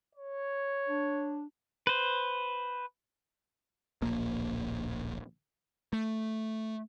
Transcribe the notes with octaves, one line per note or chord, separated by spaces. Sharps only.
C#5
D4
B4 C5
D1 A#1 A#3
A3